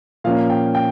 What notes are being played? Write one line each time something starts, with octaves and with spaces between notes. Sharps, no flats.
A#2 F3 A#3 C#4 F5
G5
G5